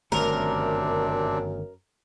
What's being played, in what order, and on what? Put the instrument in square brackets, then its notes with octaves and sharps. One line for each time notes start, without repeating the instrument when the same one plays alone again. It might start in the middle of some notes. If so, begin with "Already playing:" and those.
[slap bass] G1 D#3 A3 [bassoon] F#2 [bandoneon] C3 C4 D4 [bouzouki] A#4